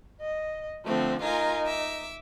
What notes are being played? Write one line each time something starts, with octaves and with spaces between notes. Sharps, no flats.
D#5
D3 F3 A3 C4
D#4 F4 A#4 G#5
E5 D6